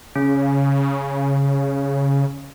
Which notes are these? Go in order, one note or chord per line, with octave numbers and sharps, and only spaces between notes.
C#3 C#4